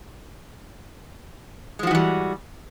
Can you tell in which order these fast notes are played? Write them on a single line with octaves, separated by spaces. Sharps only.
G#3 F3 F#4 E3 G3